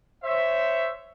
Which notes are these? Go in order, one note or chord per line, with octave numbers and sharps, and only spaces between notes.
C5 C#5 E5